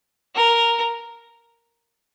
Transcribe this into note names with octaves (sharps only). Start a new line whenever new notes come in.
A#4